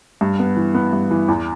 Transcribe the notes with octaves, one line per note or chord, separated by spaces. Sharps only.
G2
B3
E3
B3
G2
E3
E2